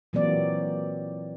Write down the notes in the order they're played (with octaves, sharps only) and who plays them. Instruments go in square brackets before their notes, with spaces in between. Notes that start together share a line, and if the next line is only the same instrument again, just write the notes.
[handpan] A#2 E3 F#3 A#3 C4 D5